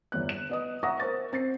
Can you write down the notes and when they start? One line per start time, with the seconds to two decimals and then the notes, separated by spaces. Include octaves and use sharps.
0.12 G1 E2 F#6
0.29 E7
0.49 B3 D#5 D#6
0.83 E5 F#5 A#5 C#6 D#6 A#6
1.00 A#4 C5 C#6 A6
1.33 C4 A6 C7